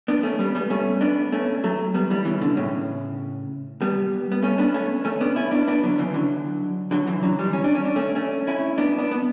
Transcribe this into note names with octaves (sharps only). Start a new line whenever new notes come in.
B3 D4
A3 C#4
G3 B3
G3 B3
A3 C#4
B3 D4
A3 C#4
F#3 A3
G3 B3
E3 G3
C#3 E3
B2 D3
A2 C#3
G3 B3
B3
A3 C#4
B3 D4
A3 C#4
A3 C#4
B3 D4
C#4 E4
B3 D4
B3 D4
D3 F#3
C#3 E3
D3 F#3
D3 F#3
C#3 E3
D3 F#3
E3 G3
C#4
D4
C#4
D4
A3 C#4
A3 C#4
C#4 E4
B3 D4
B3 D4
B3